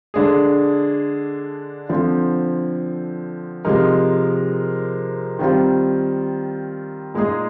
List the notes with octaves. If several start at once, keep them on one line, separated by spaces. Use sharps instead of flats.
D3 G#3 D4 G#4
D3 F3 C4
C3 F3 G#3 D#4 A#4
D#3 G3 C4 F4
A#2 G#3 D#4 G#4